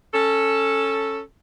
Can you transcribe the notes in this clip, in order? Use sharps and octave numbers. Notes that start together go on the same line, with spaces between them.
C#4 A4